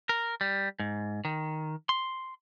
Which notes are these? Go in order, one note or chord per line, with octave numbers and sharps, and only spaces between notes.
A#4
G3
G#2
D#3
C6